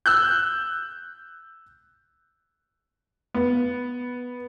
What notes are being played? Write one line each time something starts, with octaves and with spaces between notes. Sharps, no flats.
E6 F#6 G6
B3